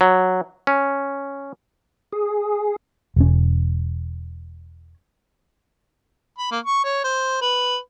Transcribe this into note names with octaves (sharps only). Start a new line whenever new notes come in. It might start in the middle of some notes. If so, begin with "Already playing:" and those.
F#3
C#4
G#4
E1 C#4
B5
A#3
C#6
C#5
C5
B4